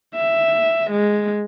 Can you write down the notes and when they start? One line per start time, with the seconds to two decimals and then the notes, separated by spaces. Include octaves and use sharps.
0.14 E5
0.91 G#3